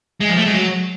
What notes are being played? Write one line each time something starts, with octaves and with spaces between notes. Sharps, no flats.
G#3
F3
A3
G#3
F#3